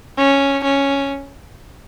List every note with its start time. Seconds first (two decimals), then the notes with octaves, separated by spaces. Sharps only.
0.18 C#4
0.64 C#4